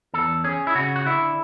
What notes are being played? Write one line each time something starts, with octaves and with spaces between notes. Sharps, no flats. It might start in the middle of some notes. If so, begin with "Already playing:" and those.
E2 A4
C#4 G#4
E4
C#3 F#4
F#4
D3 E4